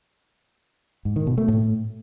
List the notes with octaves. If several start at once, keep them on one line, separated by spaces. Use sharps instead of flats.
G#2
D#3
B2
A3
A2